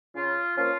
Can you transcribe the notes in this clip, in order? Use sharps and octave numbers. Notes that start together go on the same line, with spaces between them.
C#3 F4
F3 A#3 C#4 F4